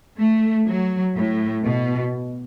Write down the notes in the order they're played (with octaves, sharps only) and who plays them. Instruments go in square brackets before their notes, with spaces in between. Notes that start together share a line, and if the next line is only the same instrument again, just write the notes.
[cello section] A3
F#3
A2
B2